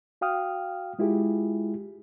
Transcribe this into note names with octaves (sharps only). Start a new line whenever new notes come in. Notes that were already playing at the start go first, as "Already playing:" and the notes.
F#4 F5 G5 D#6 F6
G#3 E4 F4 G4 G#4